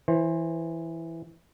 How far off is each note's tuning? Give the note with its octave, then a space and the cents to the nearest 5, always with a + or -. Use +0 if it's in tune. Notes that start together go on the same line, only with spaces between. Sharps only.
E3 +0 C5 +20